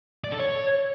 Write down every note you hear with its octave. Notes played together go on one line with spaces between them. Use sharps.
D5
A4
C#5